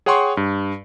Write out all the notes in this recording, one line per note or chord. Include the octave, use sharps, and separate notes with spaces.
G#4 C#5 F#5 G5 C6 C#6
G2